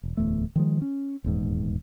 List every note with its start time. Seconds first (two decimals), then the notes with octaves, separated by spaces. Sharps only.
0.03 E1
0.17 D1 E2 A3
0.56 D#3 F3 G#3
0.82 C#4
1.24 D#1 E2 G#2